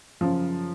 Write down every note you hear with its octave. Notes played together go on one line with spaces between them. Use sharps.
F#2 C#3 F3